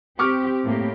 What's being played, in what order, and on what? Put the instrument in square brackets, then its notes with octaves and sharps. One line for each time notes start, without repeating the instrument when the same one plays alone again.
[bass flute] C4 [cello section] G4 [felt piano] C#6 D6 F6
[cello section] A2 A#3 G4